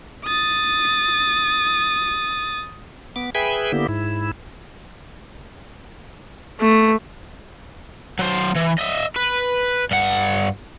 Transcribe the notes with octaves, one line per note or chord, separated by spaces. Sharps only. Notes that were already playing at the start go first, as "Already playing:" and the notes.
D#6 A6
B3 D6
G#4 B4 E5 G5 G#5 B5
D3 A#3 B3 E4 G4
G#2 E4
A3
F#3 C5
E3
D#5 E5
B4
G2 F#5